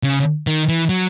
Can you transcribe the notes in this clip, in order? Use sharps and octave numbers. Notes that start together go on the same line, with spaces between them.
C#3
D#3
E3
F#3